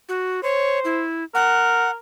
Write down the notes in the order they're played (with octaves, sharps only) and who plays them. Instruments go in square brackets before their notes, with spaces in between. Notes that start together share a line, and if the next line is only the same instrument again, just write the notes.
[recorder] F#4
[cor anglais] C5 [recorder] C#5
[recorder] E4
[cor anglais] A#4 [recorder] F#5